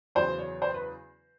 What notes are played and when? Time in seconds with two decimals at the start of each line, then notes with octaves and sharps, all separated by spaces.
0.15 E2 C#3 F#3 C5
0.38 C#5
0.62 C5
0.74 B4